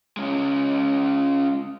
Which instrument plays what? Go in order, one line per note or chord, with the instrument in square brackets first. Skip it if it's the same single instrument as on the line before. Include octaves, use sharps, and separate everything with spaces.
[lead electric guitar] G#3 C#4